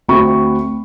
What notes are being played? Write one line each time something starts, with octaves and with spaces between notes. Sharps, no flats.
D2 A3 C4 F#4 B5 C#6